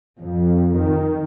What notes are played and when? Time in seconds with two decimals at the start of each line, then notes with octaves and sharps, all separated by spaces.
0.18 F2
0.78 D#3